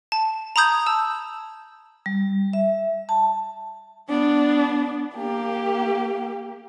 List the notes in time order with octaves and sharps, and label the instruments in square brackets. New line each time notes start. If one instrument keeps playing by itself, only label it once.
[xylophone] A5
A#5 B5 D#6 G6 G#6
A5 E6
[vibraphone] G3
E5
A5
[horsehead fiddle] B3 D4
A#3 G4